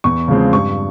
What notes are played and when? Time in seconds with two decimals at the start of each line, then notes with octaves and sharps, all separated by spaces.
0.04 E2 C#6
0.28 C#3 F3 G#3 C4
0.53 G2 C#6